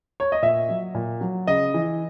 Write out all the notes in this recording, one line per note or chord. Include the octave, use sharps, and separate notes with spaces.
C#5
D#5
A#2 E5
F#3
A#2
F#3
C#3 D#5
E3